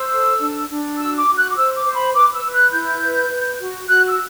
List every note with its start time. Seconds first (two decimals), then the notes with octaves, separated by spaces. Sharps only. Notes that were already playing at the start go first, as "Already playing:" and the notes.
Already playing: C5 E6
0.11 A4
0.40 D4
0.70 D4
0.98 F#4 E6
1.18 D6
1.27 F#4
1.37 F#6
1.50 D6
1.56 C5 E6
1.76 D6
1.85 C5
1.95 B5
2.14 B4 D6
2.33 E6
2.44 B4
2.53 F#6
2.72 E4 G6
3.01 B4
3.30 B4
3.59 F#4
3.88 F#4 F#6
4.08 E6